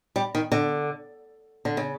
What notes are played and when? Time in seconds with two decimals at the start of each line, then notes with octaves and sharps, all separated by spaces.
0.16 G3
0.35 D#3
0.52 D3
1.65 D3
1.77 C#3